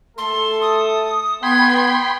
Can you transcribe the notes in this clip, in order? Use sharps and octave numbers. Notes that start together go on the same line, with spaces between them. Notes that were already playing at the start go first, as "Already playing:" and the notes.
A3 A4 C6
D#6
B3 G5 B5 C6 G#6